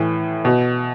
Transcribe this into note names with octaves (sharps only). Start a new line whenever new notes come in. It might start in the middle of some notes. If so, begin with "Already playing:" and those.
Already playing: A2 E3
B2